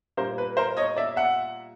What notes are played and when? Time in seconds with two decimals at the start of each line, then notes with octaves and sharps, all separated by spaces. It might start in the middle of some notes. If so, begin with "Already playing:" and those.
0.17 A#2 G3 A#3 A#4 C5
0.38 B4
0.57 A#4 C5
0.77 C#5 D#5
0.97 D5 E5
1.16 E5 F#5